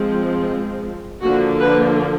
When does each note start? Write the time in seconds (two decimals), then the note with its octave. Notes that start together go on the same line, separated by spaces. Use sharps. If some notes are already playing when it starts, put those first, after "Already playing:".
Already playing: F3 G#3 C4
1.22 D3 F3 A#3 F#4
1.60 B4